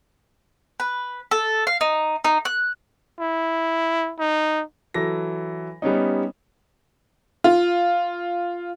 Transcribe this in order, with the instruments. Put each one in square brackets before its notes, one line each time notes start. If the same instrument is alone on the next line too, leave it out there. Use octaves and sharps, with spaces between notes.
[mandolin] B4
A4
F5
D#4
D#4
F#6
[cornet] E4
D#4
[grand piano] E3 F#3 A4 A#6
G3 B3 C#4 D#4
[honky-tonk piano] F4